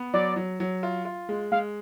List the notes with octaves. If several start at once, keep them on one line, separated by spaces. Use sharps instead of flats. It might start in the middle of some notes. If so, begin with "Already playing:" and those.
Already playing: B3
F#3 D5
F#3
F#3
F4
F4
G#3
G#3 F5